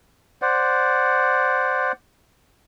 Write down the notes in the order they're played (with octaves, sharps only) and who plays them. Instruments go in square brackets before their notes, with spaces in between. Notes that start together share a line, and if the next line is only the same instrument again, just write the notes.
[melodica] C5 D5 F#5